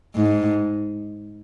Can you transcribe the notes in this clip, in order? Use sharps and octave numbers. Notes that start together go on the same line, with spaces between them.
G#2